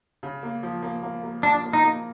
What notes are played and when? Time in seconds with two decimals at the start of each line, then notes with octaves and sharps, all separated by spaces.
0.23 C#3
0.43 A#3
0.63 F3
0.83 A#3
1.03 A#3
1.24 A#3
1.43 F3 D4
1.63 A#3
1.73 D#4
1.83 A#3